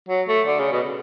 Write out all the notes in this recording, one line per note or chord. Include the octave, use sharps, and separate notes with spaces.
F#3
A3
D3
C#3
B2